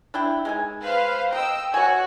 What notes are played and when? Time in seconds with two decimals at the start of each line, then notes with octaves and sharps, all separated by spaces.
0.14 D4 E4 G5
0.45 G#3 D#4 G#5
0.83 B4 C5 F5
1.33 D#5 G5 A#5 E6
1.74 F#4 C#5 G#5